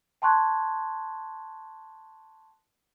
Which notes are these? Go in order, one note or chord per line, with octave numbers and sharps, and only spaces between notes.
G5 A5 C6 C#6 F#6 G#6